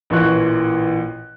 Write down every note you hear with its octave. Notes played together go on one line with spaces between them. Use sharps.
A1 A#2 E3 C#6 F#6